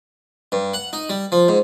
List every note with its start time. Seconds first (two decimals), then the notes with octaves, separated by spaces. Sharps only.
0.52 G2
0.74 F#5
0.93 D#4
1.10 G3
1.32 F3
1.48 G#2